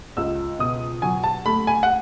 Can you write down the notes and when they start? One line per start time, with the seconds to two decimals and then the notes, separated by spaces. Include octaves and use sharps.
0.17 C#2 E6
0.59 B2 D#6
1.02 F#3 G#5
1.24 A5
1.46 A3 B5
1.67 G#5
1.83 F#5